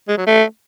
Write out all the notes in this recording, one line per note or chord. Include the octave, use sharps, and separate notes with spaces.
G#3
F#3
A3